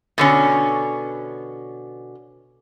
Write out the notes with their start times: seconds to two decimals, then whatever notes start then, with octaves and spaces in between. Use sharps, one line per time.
0.18 B2 D3 C#4